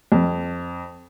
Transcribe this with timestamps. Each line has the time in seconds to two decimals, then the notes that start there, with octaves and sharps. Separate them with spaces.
0.12 F2